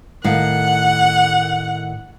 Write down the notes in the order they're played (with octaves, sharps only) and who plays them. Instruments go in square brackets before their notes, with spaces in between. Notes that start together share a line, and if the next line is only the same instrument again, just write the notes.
[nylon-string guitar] A2 D#3 F5 [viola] F#5